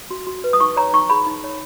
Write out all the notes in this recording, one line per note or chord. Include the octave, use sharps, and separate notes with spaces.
F#4
F#4
B4
D#6
D#4 C#6
C#5 A#5
D#4 C#6
G#4 B5
D#4
C#5